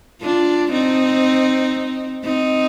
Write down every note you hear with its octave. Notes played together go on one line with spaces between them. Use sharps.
D4 F4
C4 D#4
C4 D#4